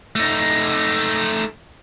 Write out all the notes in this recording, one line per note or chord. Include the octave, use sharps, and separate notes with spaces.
A3 D#4